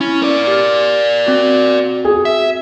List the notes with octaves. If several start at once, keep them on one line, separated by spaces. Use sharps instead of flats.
C#4 E4
A#4 D5
G4 F6
C4 F#4
G#4
E5